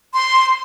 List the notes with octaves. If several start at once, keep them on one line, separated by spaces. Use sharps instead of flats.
C6